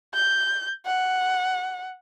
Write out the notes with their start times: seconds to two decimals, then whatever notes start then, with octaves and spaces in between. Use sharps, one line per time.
0.14 G6
0.86 F#5